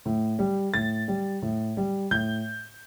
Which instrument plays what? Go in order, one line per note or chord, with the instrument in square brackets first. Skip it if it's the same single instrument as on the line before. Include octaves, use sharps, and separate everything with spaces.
[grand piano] A2
G3
A2 A6
G3
A2
G3
A2 G6